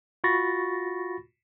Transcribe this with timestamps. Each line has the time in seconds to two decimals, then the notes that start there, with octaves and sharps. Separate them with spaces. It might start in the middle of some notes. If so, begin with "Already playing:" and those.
0.24 F4 F#4 B5 C#6 A6 A#6